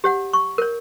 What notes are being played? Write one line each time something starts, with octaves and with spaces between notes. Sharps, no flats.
G4 C#5 F#5
C#6
A#4 C#5